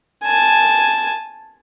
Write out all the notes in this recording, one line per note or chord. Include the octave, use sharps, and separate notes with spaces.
G#5 A5